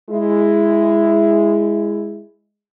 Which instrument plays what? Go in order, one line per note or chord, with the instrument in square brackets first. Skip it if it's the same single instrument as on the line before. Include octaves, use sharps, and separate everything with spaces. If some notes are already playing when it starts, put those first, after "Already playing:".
[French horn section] G#3 E4